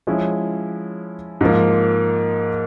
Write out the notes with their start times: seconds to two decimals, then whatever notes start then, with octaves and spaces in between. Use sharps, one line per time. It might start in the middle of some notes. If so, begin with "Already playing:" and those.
0.07 F3 G#3 C#4 E4
1.41 G#2 F3 A#3